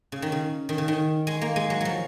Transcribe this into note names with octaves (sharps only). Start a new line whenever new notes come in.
C#3
D#3
C#3
D#3
C#3
D#3
G#3
A#3
G#3
F#3
F3 F#3